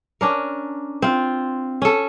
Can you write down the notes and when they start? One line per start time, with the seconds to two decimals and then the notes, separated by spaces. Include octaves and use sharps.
0.21 C#4 D4 A#4
1.02 C4 F4
1.82 C#4 A4